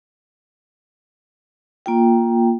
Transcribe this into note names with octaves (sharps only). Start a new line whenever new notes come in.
A#3 F4 G5